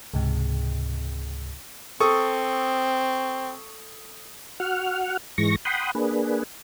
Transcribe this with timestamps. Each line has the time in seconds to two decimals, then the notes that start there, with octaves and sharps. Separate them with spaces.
0.14 C#2 G#2 C3
2.00 C4 A4 C#6 D#6
4.60 F#4 F#5 F6
5.38 G#2 E3 G#3 C#6 A#6
5.65 F#5 G5 B5 C6 D#6
5.95 A#3 D4 G#4 B4